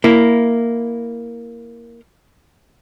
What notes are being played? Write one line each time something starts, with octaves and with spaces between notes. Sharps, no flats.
A#3 E4